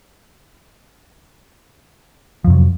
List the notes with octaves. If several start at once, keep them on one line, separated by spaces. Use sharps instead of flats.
F2 C3 F3 F#3